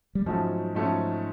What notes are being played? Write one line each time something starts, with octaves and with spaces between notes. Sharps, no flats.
G3
G#2 F3 F#3 A3 C#4
G#2 F3 A3 C#4